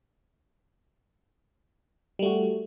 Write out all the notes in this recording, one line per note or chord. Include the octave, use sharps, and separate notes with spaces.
G3 A3 F#4